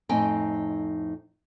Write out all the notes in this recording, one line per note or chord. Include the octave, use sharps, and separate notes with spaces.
F2 A2 C4 D#4 G5 G#5